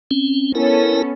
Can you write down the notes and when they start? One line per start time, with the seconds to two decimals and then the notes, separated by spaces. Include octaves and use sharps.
0.11 C4 C#4
0.55 B3 C#4 E4 A4 A#4